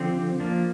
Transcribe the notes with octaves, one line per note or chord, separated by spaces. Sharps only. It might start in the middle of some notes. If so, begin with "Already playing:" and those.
Already playing: D3 F3 C4
G4
F3 A#3 D4